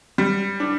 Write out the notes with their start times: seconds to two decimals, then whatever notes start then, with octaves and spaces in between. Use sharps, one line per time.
0.18 G3
0.60 D4